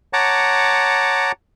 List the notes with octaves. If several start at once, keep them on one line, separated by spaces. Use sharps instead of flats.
C#5 F#5 A5 A#5 D6